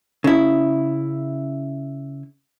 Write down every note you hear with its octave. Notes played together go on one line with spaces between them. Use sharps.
C#3 E4